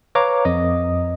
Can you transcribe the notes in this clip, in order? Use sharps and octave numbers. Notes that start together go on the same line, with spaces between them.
B4 C#5 F5 A#5 D6
F2 D#5 D#6